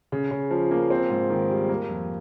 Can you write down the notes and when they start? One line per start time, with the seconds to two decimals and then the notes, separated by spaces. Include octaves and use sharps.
0.12 C#3
0.31 C#3
0.51 F3
0.71 A#3
0.90 C4
1.10 G#2
1.30 D#3
1.50 G3
1.69 A#3
1.89 F2